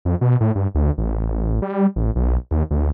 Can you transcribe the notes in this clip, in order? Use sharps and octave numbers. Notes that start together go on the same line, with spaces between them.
F2
B2
A2
G2
D2
A1
G3
A1
B1
D#2
D2